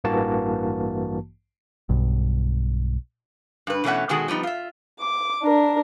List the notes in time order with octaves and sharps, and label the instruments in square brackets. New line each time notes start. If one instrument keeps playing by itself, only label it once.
[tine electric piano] A1 G2 E3 A#3 F#4 A5
[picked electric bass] B1 G2
[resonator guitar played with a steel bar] G2 B4
B2 E3 A3 C#4 E5 F#5
B2 D#3 G#3 F#4 G#4 A4
F3 G3 B3 D#4
F4 E5
[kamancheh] D6
D4 A#4